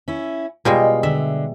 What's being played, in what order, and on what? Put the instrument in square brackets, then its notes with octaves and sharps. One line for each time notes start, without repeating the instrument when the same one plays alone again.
[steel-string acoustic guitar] C#4 E4
[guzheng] B2 G3 G#3 [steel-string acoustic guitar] F4 G5
[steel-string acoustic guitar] D3 [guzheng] E5